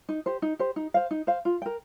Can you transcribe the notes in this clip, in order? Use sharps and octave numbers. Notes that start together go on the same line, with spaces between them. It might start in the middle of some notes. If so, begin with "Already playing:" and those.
D#4
G4 C5
D#4
G4 C5
D#4
C5 F5
D#4
C5 F5
F4
A#4 G5